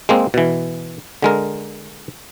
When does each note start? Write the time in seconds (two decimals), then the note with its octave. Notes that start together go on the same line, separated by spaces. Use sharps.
0.09 G#3 A#3 C4
0.34 B2 E3
1.22 D3 G#3 A#4